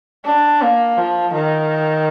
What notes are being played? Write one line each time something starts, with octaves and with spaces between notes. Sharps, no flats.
D4
A#3
F3
D#3